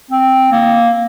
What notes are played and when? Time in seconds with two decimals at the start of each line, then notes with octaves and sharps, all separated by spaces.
0.11 C4
0.52 A#3